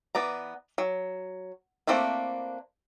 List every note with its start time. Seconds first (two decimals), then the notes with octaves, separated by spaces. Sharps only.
0.15 E3 B3 D5 A#5
0.78 F#3
1.87 A3 A#3 C4 D4 E4